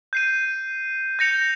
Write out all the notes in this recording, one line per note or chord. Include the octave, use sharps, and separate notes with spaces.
G6 C7 D#7
G6 A#6 C#7 F7